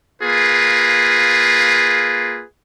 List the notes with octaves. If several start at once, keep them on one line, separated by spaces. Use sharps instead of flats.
A#3 F4 G#4 B4